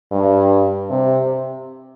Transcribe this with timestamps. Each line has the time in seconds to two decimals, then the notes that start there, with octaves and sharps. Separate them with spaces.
0.12 G2
0.90 C3